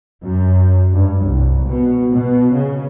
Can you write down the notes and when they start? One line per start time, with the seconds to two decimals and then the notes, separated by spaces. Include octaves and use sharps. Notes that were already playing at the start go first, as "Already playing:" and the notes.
0.23 F#2
0.93 G2
1.27 C2
1.67 B2
2.15 B2
2.54 C#3